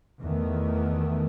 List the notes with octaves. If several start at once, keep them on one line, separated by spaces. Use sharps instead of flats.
E2 D#3 A3